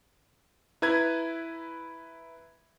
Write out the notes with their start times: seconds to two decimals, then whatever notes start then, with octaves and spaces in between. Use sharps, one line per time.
0.82 E4 B4 A#5 G#6